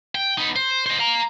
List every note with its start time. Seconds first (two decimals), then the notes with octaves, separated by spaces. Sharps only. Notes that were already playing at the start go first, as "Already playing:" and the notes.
0.15 G5
0.38 B3 D#4
0.56 C5
0.86 C5 D#5
0.99 F5 A#5